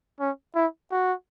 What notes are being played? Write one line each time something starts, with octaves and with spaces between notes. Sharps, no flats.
C#4
E4
F#4